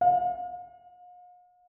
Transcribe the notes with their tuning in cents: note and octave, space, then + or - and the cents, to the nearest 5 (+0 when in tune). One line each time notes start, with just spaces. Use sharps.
F5 +45